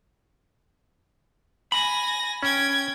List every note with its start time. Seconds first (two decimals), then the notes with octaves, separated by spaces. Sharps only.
1.72 G#5 B5 A#6
2.43 C#4 G5 G#6